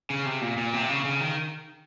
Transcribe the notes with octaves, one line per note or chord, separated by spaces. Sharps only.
C#3
C3
A#2
A#2
C3
C#3
C#3
D#3